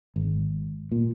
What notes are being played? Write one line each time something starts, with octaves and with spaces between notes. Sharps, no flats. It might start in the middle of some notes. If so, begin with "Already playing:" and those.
G#1
A#2